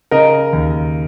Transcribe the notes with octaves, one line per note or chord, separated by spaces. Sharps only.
C#3 A#4 D#5
D#2